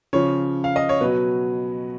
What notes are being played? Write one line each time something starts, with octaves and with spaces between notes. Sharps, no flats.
C#3 F3 C#5
F5
D#5
C#5
B2 F#3 B4